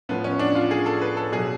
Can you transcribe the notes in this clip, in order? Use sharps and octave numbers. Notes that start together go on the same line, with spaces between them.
A2 F3 B3
C#4
D4
F4
G#4
A4
B4
A4
B2 F#3 G#4